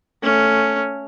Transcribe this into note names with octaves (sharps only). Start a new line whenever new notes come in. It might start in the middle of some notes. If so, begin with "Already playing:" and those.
A3 C#4